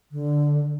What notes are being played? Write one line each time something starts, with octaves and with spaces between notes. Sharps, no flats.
D3